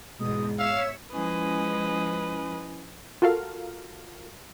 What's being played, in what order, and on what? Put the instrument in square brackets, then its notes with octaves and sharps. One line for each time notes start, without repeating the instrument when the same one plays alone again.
[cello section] E2 G#2 B2 [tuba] G#3 [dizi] D#6
[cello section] C#5 E5 [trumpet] F5 [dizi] E6
[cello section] F3 G#3 [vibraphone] C#4 E4 G#5 [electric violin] B4 D#5
[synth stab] F4 F#4 A4 A#4 F5